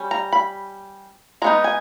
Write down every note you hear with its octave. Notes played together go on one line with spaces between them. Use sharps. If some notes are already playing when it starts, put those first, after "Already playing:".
Already playing: G3 C#4
A#5
B5
G#3 B3 D#4 A#5
G#5